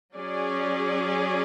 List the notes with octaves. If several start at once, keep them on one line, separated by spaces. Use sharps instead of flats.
F#3 C#4 G#4 D5